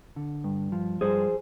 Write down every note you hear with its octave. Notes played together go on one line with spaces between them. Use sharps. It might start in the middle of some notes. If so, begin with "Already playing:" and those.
D3
G2
F3
G2 G#4 C5